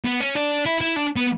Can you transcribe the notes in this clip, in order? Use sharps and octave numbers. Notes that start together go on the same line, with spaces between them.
B3
C#4
D4
E4
E4
D4
B3